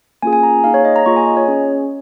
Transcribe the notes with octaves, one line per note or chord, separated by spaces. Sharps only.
A#3 C#4 F4 G#4 G#5
G#5
A#5
A#3 D#4 G#4 F5
C#5
D#5
A#5
A#3 F4 G#4 C#6
G#5
D#5
C#5
C#4 G#4